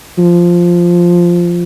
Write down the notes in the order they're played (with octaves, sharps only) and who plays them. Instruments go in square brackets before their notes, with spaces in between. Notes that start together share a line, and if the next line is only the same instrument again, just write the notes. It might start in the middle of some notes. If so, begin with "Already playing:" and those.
[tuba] F3